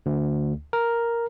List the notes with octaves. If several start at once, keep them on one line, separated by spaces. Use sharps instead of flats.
D2
A#4